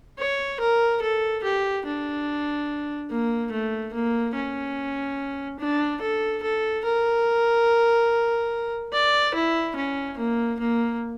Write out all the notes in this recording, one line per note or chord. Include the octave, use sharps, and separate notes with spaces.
C#5
A#4
A4
G4
D4
A#3
A3
A#3
C#4
D4
A4
A4
A#4
D5
E4
C#4
A#3
A#3